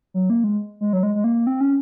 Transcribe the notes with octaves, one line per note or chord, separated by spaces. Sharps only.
F#3
A#3
G#3
G#3
F#3
G#3
G#3
A#3
C4
C#4